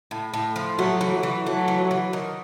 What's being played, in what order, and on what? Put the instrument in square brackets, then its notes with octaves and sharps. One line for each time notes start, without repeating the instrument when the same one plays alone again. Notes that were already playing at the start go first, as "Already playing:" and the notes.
[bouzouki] A2
A2
F3
[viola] F#3 [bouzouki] A3
[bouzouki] E3
[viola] F#3
[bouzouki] E3
[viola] F#3 [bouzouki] A3
[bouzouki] E3
E3
D#3